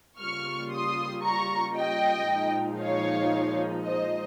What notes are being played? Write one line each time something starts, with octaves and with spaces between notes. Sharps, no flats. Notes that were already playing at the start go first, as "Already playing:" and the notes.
C#3 G3 A#3 F4 C#6 F6
C6 D#6
A#5 C#6
D#5 G5
A#2 F3 G#3 D#4
C#5 F5
C5 D#5